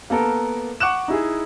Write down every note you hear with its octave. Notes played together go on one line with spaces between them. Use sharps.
A#3 B3 A4 A#4
F#5 C#6 D6 F#6 E7
D#4 E4 G#4